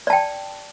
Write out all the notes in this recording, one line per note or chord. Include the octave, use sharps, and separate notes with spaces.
D5 G5 A5